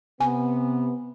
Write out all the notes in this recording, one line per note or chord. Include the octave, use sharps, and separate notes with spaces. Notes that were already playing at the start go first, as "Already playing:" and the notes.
C3 B3 G#5